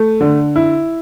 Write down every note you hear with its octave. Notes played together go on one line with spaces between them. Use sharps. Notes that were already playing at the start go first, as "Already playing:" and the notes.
Already playing: A3
D3
E4